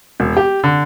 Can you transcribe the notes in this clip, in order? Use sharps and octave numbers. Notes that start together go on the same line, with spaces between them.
E1
G4
D3